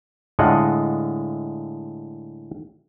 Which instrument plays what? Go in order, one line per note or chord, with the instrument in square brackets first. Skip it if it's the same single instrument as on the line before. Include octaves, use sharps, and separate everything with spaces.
[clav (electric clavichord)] A2 D3 G#3 F4 D#5 F#5